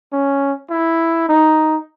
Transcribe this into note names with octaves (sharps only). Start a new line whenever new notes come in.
C#4
E4
D#4